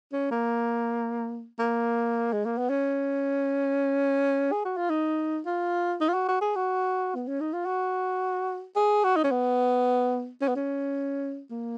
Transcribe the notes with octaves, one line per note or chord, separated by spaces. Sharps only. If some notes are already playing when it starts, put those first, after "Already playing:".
C#4
A#3
A#3
G#3
A#3
B3
C#4
G#4
F#4
F4
D#4
F4
D#4
F4
F#4
F#4
G#4
F#4
B3
C#4
D#4
F4
F#4
G#4
F#4
D#4
C#4
B3
C#4
B3
C#4
A#3